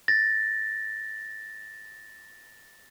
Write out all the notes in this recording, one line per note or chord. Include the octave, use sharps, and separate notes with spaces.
A6 A#6